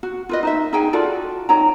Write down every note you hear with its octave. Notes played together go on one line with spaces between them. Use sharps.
F#4
F4 B4 D#5
D#4 C5 E5
D#4 G#4 G5 G#5
F4 F#4 A4 D5
D#4 C#5 G5 A#5